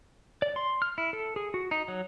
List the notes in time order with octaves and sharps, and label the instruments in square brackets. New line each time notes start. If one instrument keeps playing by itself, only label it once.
[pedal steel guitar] D5
C6
F6
E4
A4
G#4
F#4
D#4
F#3